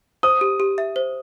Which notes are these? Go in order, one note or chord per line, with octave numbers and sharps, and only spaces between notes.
C5 D#6
G4
G4
E5
C5